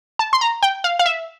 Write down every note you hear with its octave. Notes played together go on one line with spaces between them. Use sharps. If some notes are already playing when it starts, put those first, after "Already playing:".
A5
C6
A#5
G5
F5
F5
E5